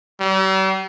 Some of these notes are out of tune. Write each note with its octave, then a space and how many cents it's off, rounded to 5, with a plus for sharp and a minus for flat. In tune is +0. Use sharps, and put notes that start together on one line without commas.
G3 -45